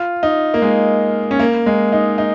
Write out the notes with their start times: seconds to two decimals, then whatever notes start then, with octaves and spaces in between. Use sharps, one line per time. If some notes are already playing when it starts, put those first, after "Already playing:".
Already playing: F4
0.23 D#4
0.54 A#3
0.62 G#3
1.31 C#4
1.39 A#3
1.66 G#3
1.92 D#4
2.18 D#4